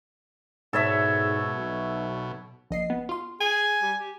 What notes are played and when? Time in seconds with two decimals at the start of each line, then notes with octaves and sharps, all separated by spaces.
0.73 G#2 B2 A4 C#5 E5
1.56 B1
2.70 A#1 D#5 C7
2.90 B3
3.09 F4 C6
3.40 G#4 G#5
3.82 G3
3.98 G4